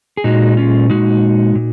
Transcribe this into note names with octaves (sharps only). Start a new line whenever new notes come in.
G#4
A#2 G#3 D#4 F#4
C#4 F4
A#2 G#3 D#4 F#4
A#2